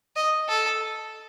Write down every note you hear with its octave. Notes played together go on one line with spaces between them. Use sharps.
D#5
A4